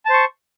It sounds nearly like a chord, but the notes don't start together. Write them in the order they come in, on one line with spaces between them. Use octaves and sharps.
A5 C5 C#6